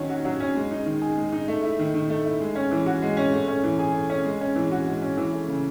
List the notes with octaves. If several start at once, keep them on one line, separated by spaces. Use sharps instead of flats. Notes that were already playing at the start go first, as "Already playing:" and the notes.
Already playing: D#3 F#3 C#4
F#4
F#3
C#4
G#3
D#4
D#3
G#4
G#3
D#4
A3
E4
D#3
D#3
A3
E4
G#3
C#4
E3
F#4
G#3
C#4
A3
C#4
E3
G#4
A3
C#4
G#3
C#4
E3
F#4
G#3
C#4
E3
A3
C#3